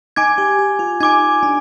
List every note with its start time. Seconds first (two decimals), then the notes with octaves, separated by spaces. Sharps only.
0.16 D#4 G#5 D6 G#6
0.38 G4
0.59 G4
0.79 F4
1.00 D#4 G#5 D6 G#6
1.43 D4